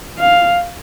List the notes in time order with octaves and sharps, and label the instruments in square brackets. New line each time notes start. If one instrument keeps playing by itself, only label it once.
[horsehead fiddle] F5